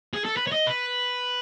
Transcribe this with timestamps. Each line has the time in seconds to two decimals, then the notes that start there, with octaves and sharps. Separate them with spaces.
0.14 G#4
0.25 A4
0.37 B4
0.47 C#5
0.52 D#5
0.67 B4